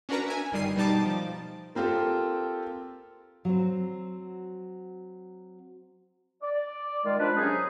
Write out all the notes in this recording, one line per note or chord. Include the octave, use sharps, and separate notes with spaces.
C#4 D4 F#4 A#4 B4 A#5
E5 G#5
G1 D#3 G3 C7 D#7
B2 G3 D#4 A5 D6
F3
A#3 C4 F4 G4 A4
F#3 C4
D5
D#3 G#3 F4
F3 D4 B4
G#2 C3 F#3 C#4 D#4 G#4